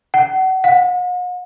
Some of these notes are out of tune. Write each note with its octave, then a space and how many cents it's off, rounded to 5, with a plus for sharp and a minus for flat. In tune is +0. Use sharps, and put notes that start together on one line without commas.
F#5 +30
F#5 -45